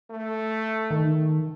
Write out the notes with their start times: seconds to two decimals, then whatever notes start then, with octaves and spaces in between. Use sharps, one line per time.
0.11 A3
0.91 D#3